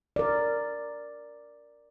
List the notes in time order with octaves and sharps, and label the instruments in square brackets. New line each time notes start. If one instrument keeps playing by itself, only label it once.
[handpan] A#4 D5